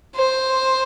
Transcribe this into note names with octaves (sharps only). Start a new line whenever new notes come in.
C5